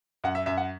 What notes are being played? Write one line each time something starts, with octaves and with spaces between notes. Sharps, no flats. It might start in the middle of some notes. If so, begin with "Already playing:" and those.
F#2 F#5
E5
F#2 E5
F#5